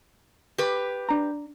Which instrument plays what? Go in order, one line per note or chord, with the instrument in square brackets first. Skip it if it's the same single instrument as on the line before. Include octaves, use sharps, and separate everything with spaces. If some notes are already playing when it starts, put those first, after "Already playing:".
[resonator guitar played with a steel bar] G4 B4
[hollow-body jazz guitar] D4 A#5